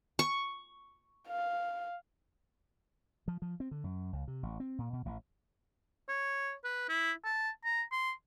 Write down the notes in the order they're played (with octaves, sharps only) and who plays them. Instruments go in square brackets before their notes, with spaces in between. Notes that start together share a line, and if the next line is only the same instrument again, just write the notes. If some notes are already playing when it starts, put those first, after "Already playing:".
[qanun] C#6
[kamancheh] F5
[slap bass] F3
F3
C4
D3
F#2
C#2
C3
A1
C4
A#2
B2
A1
[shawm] C#5
B4
E4
A5
A#5
C6